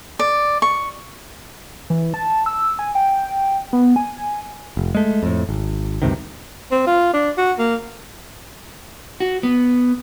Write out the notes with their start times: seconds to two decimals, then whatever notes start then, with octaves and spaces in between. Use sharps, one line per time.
0.19 D5
0.62 C#6
1.90 E3
2.14 A5
2.46 E6
2.79 G#5
2.95 G5
3.73 B3
3.96 G#5
4.77 F1
4.95 G#3 A3
5.23 F2 A2
5.49 G#1
6.02 D2 G2 C3 D#3
6.71 C4
6.87 F4
7.13 D4
7.37 F#4
7.58 A#3
9.20 F#4
9.43 B3